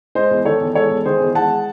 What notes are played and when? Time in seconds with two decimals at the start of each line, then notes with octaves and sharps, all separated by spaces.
0.15 G#3 C5 D#5
0.31 E2
0.45 D#3 A4 C#5
0.60 E2
0.75 G#3 A4 C#5
0.90 E2
1.05 D#3 G#4 C5
1.21 E2
1.35 G#3 F#5 A5